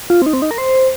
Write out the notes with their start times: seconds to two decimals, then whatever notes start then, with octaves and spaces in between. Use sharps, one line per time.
0.10 F4
0.22 C4
0.26 D#4
0.33 C4
0.42 D#4
0.51 A#4
0.58 C5